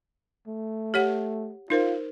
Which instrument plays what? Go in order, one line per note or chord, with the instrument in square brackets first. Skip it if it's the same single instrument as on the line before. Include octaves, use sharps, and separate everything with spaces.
[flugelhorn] A3
[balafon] G4 C#5 F#5
[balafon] D#4 A#4 C5 [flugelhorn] F4